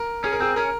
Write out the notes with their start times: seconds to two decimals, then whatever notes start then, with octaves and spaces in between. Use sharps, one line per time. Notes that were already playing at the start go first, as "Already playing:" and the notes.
Already playing: A#4
0.24 C#4 G#4
0.32 A#4
0.40 C4 G#4
0.56 C#4 A#4